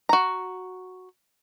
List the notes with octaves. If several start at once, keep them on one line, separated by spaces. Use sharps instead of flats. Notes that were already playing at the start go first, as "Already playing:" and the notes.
F#4 A#5